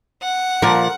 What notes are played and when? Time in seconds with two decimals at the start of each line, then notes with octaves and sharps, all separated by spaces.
0.22 F#5
0.62 A#2 F3 A#4